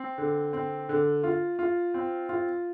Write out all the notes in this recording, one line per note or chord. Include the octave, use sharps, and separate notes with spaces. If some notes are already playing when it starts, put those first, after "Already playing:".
Already playing: C4
D3
C4
D3
F4
F4
C4
F4